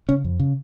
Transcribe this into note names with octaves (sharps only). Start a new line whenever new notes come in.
C#3 C#4
F2
C#3